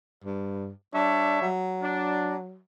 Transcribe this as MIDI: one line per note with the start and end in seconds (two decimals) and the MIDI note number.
0.24 0.70 43
0.94 1.49 55
0.94 1.42 62
0.94 1.49 73
0.94 1.49 76
1.42 2.59 54
1.82 2.34 62